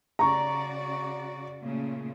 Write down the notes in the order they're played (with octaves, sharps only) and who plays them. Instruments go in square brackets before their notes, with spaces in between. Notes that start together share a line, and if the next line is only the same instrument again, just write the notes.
[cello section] C#3 F#4 D5 [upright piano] A#5 C#6
[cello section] A#2 C#3 A3